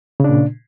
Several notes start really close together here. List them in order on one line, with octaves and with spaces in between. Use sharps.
C#3 D4 A#2